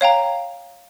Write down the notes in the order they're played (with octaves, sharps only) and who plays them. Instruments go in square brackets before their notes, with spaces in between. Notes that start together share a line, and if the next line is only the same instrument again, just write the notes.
[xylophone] C#5 F5 G5 A#5